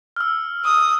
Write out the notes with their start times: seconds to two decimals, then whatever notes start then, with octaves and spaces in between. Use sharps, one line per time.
0.16 E6 F6
0.65 D#6